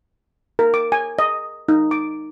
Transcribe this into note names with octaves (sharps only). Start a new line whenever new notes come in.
A#4
D6
G#5
D#5
D#4
D6